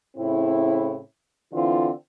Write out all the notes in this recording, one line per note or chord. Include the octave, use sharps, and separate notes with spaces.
A2 C#3 C4 E4
D3 E3 C4 E4 F4